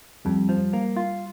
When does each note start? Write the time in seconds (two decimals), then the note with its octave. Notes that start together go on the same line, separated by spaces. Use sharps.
0.25 F2 G3
0.49 F3
0.73 A#3
0.97 F4